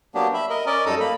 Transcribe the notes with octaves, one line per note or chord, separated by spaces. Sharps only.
F#3 A#3 B3 D4 G4
E5 B5
A#4 D#5
C#4 A#4 D5 D#5
F#2 G3 D#4 A4 A#5 D#6
A#3 B5